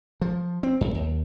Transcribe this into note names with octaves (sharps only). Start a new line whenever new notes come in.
F3
C4
F#2
D#2